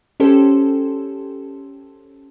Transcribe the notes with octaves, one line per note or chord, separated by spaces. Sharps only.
C#4 G4 A4 C5